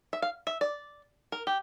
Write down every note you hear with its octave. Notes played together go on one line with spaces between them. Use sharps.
E5
F5
E5
D5
A#4
G4